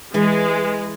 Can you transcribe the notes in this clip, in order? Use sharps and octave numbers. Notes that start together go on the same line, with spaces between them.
E3 G#3